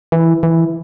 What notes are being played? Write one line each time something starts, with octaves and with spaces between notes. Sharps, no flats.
E3
E3